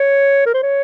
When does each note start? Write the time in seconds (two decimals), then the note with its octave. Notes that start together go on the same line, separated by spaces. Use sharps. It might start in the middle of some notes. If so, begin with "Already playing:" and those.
Already playing: C#5
0.46 A#4
0.54 C5
0.63 C#5